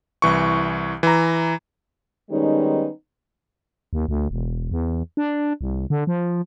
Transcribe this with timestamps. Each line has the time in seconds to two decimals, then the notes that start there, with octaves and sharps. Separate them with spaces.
0.22 C2 E3 C#6
1.03 E3 A#5
2.31 D#3 G3 G#3 B3 C#4 D#4
3.93 D#2
4.09 D2
4.31 E1
4.71 E2
5.17 D4
5.61 C2
5.90 D3
6.07 F3